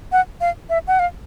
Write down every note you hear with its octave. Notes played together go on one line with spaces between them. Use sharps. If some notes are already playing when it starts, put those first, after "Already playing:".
F#5
F5
E5
F#5
F5